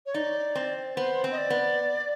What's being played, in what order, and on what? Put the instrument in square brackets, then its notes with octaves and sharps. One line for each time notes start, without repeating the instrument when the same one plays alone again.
[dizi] C#5
[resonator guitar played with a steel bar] D#4 [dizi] D5
[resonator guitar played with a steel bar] C4
[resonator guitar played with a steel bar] B3 [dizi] C5
[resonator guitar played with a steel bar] C4
[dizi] D#5
D5
[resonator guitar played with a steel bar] B3